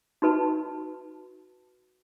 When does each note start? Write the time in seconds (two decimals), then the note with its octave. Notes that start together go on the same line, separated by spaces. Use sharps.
0.22 D#4 F#4 B4 A5